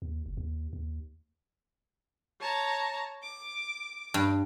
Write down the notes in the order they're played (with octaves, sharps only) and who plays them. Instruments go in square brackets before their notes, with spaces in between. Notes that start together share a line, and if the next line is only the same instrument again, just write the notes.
[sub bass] D#2
F#1
D#2
D#2
[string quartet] C#5 A5 A#5
D6
[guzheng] G2